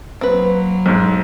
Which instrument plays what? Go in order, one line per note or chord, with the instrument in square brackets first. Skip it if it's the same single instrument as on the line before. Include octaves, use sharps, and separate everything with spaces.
[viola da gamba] F#3 A#3 [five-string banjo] C4 B4
[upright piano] B1 G#2